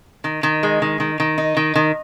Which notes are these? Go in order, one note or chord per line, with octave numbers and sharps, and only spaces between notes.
D#3
D#3
G#3
D#3
D#3
D#3
D#4
D#3
D#3